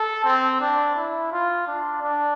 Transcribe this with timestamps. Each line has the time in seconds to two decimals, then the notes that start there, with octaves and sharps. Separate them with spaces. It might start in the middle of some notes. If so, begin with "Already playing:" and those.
Already playing: A4
0.24 C4
0.61 D4
0.96 E4
1.32 F4
1.67 D4
2.02 D4